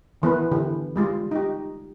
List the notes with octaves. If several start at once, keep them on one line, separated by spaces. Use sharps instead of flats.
D#3 E3 B3 B4
D3 E3 G4
G3 G#3 F4
D#4 G4